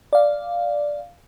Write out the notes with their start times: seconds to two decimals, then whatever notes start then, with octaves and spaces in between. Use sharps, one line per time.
0.13 D5 F5